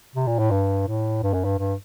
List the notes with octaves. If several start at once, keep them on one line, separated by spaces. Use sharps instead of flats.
C3
A#2
A2
G2
A2
G2
F#2
G2
G2